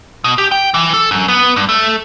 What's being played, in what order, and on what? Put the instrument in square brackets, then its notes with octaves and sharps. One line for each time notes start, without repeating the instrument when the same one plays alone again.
[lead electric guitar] B2
G4
G5
E3
A4
F#2
B3
G2
A3